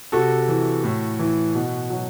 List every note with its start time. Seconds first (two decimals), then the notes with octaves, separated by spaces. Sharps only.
0.12 C3 F#4 A4
0.48 E3
0.84 A2
1.19 E3
1.55 B2
1.90 F#3